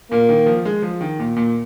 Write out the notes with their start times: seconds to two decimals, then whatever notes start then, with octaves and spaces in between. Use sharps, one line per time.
0.11 A#2 A#3
0.29 D#3
0.46 F3
0.65 G#3
0.82 F3
1.01 D#3
1.19 A#2
1.37 A#2